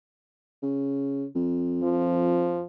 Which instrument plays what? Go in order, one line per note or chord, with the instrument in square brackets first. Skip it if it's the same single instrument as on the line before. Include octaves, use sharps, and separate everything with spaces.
[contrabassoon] C#3
F2
[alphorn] F3